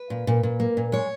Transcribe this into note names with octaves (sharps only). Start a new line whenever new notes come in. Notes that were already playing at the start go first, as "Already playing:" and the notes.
Already playing: B4
A#2
A#2
A#2
A#3
A#2
G#3 C#5